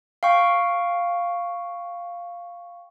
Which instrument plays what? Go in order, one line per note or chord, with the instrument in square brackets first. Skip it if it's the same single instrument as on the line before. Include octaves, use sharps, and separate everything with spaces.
[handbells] F5 G5 C#6